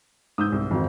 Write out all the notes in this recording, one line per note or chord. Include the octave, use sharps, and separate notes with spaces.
G#2 D#6 E6 G6
C2
G#1 F2 F#4